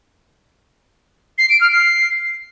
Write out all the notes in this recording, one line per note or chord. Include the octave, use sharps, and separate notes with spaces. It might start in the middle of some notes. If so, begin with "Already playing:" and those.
C7
D7
F6
C7